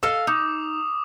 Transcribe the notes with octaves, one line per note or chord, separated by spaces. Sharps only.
A4 D#5 F5 E6
D#4 D6 D#6 F7